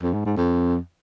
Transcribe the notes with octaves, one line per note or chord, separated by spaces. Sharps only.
F2
G#2
G#2
F2